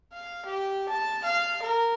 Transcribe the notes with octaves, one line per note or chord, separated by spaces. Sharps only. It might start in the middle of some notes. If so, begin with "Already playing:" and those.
F5
G4
A5
F5
A#4